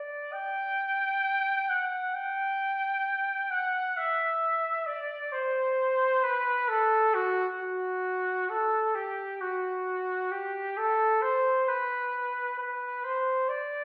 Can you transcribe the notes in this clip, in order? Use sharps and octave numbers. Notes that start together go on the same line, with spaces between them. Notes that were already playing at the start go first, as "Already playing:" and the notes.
Already playing: D5
G5
F#5
G5
F#5
E5
D5
C5
B4
A4
F#4
F#4
A4
G4
F#4
G4
A4
C5
B4
B4
C5
D5